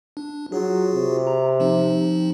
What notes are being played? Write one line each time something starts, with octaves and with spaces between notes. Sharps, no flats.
D4
F#3 F4 F#4 G#4
C3
A#5
F3 C4 D#4